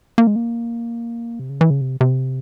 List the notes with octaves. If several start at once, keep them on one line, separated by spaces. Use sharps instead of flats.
A#3
G#3
A#3
C3
C#3
E3
C#3
C3
C3